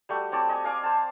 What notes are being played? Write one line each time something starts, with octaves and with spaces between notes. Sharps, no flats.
G3 A3 F#4
C4 C#5 D5 A5
D#5 G#5
D5 F5 G#5
C5 A5